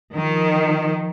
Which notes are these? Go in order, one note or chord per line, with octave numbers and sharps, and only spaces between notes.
D#3 F3